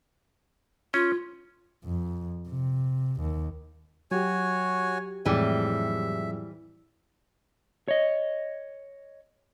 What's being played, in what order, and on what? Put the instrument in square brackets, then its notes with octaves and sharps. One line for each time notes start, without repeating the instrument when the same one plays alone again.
[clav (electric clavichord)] C#4 [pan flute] F4
[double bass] F2
C3
D#2
[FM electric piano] F#3 G4 [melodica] F#4 C#5 G#5
[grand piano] F2 A2 G#3 [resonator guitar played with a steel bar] E3 G3 [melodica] E5
[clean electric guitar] C#5 D#5